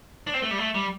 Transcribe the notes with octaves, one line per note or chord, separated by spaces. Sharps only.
D4
C4
A3
G3
A3
G3